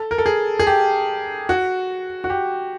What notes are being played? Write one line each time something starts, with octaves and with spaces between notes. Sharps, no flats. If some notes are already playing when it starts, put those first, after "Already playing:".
Already playing: A4
A#4
A4
G#4
G#4
G4
F#4
F#4
G4